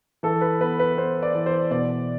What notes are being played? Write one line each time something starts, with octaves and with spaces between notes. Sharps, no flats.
E3 A4
B4
B3 B4
B4
B3 C5
D5
E3
C5
B2 D5